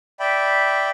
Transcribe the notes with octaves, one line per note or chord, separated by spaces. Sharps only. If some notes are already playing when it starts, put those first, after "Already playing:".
D5 E5 G5 B5